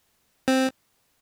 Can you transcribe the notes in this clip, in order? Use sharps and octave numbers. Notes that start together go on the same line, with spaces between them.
C4